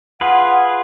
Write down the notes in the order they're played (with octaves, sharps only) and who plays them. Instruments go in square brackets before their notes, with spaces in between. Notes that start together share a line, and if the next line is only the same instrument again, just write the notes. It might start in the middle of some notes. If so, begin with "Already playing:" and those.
[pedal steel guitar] F4 G#4 B4 [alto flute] F#5